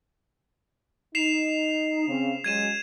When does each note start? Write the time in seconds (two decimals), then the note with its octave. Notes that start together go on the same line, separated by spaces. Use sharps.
1.15 D#4 C7 E7 F7
2.08 C#3 C4
2.44 F#3 G#3 C#4 G#6 D#7 E7